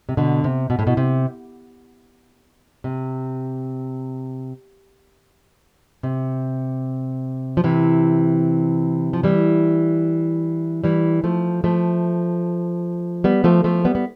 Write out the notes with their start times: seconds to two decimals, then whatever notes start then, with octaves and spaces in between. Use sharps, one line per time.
0.09 C3
0.17 B2 D3
0.44 C3
0.70 B2
0.79 A2
0.87 B2
0.97 C3
2.84 C3
6.03 C3
7.57 F3
7.64 C3 E3
9.13 F3
9.23 E3 G3
10.84 E3 G3
11.24 F3 A3
11.64 F3 A3
13.24 G3 B3
13.44 F3 A3
13.64 F3 A3
13.85 G3 B3
13.95 B3